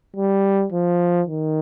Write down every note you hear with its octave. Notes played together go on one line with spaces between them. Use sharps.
G3
F3
D#3